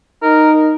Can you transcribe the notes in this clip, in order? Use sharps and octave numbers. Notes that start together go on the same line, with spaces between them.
D#4 A#4